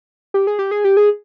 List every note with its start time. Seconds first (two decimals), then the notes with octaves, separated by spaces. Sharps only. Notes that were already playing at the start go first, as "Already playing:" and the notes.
0.34 G4
0.47 G#4
0.59 G4
0.71 G#4
0.84 G4
0.97 G#4